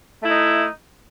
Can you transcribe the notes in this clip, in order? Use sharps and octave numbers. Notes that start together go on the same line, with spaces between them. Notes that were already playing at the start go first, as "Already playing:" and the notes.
A3 D#4 E4